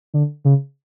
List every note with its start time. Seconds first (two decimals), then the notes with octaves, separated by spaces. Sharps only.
0.14 D3
0.45 C#3